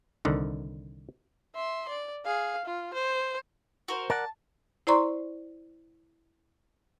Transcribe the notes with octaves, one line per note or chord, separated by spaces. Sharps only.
C2 D3 D#3
E5 C6
D5
G#4 F5
F4
C5
F#4 A#4 C5
A#4 D5 F#5 A5
E4 C5 D5 A#5 C6 C#6